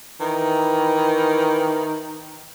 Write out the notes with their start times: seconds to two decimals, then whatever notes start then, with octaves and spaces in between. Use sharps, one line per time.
0.20 D#3 E3